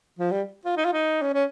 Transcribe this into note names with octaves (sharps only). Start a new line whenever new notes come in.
F3
G3
F4
D#4
F4
D#4
C#4
C#4